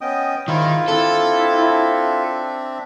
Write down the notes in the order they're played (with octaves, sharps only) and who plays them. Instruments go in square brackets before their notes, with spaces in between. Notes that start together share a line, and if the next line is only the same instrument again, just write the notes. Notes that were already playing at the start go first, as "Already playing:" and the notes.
[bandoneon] B3 C#4 D#5 [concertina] G5 D#6
[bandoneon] G#2 E4 [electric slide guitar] D#3 [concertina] F4
[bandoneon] C4 D4 E5 [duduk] E4 [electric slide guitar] A4